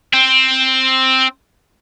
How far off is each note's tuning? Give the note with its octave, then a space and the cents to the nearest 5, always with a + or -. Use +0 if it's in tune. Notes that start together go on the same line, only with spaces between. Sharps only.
C4 +5